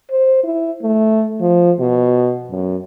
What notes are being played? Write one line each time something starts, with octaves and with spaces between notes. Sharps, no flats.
C5
E4
A3
F3
B2
F#2